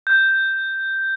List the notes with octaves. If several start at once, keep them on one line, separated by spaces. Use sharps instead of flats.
G6